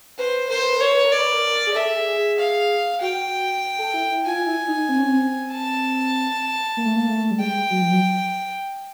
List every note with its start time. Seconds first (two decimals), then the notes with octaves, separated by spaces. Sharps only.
0.18 B4 C5
0.49 A#4 C5
0.63 B4
0.76 A#4 C#5
0.91 B4
1.04 A#4
1.12 D5
1.18 B4
1.32 A#4
1.67 G#4
1.74 A4 E5
1.96 G#4
2.16 G#4
2.38 F5
3.01 F#4 G5
3.79 A4
3.94 E4
4.11 E4
4.25 F4 G#5
4.46 E4
4.68 D#4
4.89 C4
4.99 C#4
5.08 C4
5.52 A5
6.77 A#3
6.86 A3
6.96 A#3
7.08 A3
7.31 G3
7.39 G#3 G5
7.70 F#3
7.82 F3
7.91 F#3